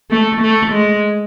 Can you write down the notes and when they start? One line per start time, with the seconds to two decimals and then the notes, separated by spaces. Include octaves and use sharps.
0.11 A3
0.41 A3
0.72 G#3